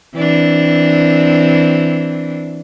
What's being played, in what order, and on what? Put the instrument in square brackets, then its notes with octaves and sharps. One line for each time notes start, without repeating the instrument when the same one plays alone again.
[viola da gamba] E3 C4 D4